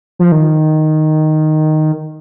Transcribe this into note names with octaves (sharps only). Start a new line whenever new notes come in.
F3
D#3